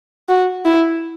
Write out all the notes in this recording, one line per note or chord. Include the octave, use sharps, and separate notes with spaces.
F#4
E4